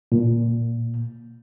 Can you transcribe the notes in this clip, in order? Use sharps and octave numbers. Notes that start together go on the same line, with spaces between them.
A#2